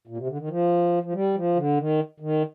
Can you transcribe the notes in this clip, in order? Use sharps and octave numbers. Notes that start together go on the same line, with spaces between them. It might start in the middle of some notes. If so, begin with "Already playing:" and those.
A#2
C3
D3
D#3
F3
F3
G3
F3
D3
D#3
D#3